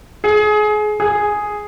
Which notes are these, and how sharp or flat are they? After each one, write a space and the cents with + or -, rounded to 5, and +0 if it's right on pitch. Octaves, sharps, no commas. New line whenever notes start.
G#4 +25
G#4 +0